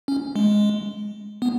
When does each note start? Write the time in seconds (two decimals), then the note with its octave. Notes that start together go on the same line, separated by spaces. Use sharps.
0.08 C#4
0.36 G#3
1.42 B3